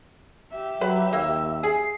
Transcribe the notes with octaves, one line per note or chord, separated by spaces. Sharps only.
G4 E5
F#3 B4 B5
D#2 A#3 E6
G#4 C7